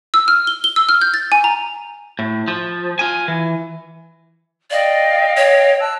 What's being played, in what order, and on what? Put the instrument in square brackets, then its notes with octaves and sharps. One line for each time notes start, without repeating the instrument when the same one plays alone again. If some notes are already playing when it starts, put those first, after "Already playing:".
[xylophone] E6
F6
G7
G7
E6
F6
G6
A6
G#5
A#5
[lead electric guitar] A2
F3
F4 G#5
E3
[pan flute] D5 [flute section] D#5 F5 G5
[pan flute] C#5
[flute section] A5 E6 F#6